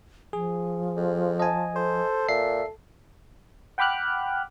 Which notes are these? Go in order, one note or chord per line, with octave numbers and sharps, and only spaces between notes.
F3 G#4
F2
D#5 G#5 A5
A4 C5
A#2 E5 C7
F#5 G5 B5 D6 F6 F#6